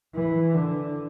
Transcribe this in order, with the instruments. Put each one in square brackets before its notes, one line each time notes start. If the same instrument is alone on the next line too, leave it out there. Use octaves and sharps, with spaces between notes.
[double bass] E3
D3